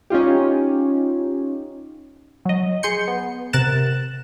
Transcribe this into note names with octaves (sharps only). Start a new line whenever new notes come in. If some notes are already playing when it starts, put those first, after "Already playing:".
C#4 D#4 F4 G4
F#3 D#5
G#4 C6 G6 C#7
B3
C3 A#4 F#6 A6 E7